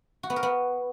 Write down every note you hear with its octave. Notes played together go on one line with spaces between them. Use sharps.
F#4
B3
A#4
B3